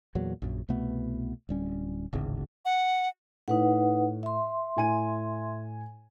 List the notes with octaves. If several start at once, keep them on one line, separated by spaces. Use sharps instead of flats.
E2 A#2 F#3
A#1 F#2
C2 B2 A3 B3
D1 G3 C#4
D1 G#1 C#3
F#5
A2 D#4 B4 F#5
E5 C6
A2 G#5 D#7